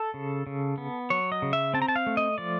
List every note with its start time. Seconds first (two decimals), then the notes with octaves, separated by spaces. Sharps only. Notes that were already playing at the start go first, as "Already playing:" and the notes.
Already playing: A4
0.14 C#3
0.47 C#3
0.78 B3
1.10 F#3 C#5
1.32 D#5
1.42 C#3
1.53 E5
1.74 C4 A5
1.82 A#5
1.88 A5
1.96 F5
2.07 A3
2.17 D#5
2.38 F3 D5